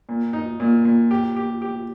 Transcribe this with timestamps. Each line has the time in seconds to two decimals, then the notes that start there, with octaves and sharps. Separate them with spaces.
0.09 A#2
0.33 D#4
0.60 A#2
0.85 A#2
1.11 G4
1.36 G4
1.62 G4